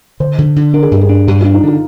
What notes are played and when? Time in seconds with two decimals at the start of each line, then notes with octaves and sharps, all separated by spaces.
0.20 D3 C5
0.38 D3
0.56 D3
0.74 D4 A#4
0.83 G#4
0.91 G2 G4
1.01 G#4
1.09 D4
1.27 G2 G4
1.41 F4
1.45 D4
1.54 D#4
1.63 D3 F4